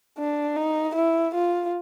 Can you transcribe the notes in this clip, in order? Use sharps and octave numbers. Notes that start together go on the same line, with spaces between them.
D4
D#4
E4
F4